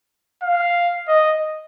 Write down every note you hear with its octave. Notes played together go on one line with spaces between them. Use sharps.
F5
D#5